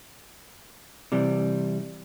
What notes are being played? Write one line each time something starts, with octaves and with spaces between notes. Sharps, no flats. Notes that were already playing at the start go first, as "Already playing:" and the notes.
C3 E3 G3